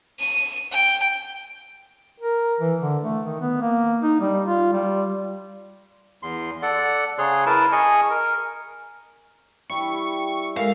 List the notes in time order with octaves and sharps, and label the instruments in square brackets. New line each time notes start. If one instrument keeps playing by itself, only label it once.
[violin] D#7
G5
[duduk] A#4
E3
D3
A3
D#3
B3
A#3
D#4
G3
F4
G3
[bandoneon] E2 C6
A4 D5 F#5
C#3 G#4 C#5 C6 F#6
E4 A#4 B4 A5
G#4 D#5 G#5 C#6
A#4
[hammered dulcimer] G3 E4 [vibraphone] G5 [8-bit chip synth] C#6
[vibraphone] G#3 A4 A#4 [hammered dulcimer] E5 [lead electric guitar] F5